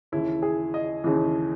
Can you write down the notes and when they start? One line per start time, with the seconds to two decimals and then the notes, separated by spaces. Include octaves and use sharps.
0.12 D#2 C#3 E3 E4
0.42 G#4
0.74 D#5
1.04 D#2 C#3 E3